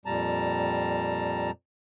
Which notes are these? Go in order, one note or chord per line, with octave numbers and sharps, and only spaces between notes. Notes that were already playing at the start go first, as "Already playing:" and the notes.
F2 A#2 G3 A5 A#5